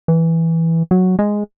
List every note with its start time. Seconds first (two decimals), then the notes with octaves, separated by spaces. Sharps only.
0.08 E3
0.91 F#3
1.19 G#3